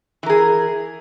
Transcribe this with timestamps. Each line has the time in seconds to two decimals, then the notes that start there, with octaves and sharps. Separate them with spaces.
0.23 E3
0.26 A#4
0.30 G#4